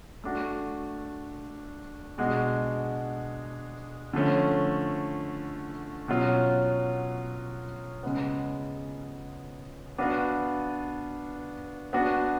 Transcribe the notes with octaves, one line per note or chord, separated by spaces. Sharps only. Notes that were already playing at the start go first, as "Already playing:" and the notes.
A3 D4 F#4
B2 G#3 D4 F#4
D3 F3 A3 C#4
B2 F#3 C#4 F4
C#3 G#3 B3
B3 D4 F#4 B4 F5
B3 D4 F#4